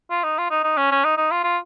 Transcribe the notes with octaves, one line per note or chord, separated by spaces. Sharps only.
F4
D#4
F4
D#4
D#4
C#4
C#4
D#4
D#4
F4
F4